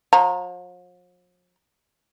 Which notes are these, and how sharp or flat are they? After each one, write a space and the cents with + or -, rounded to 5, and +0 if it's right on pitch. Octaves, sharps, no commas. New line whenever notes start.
F3 +45 A#5 +0